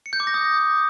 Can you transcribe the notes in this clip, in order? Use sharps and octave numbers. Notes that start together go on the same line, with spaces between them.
C#7
G6
D6
A#6
D#6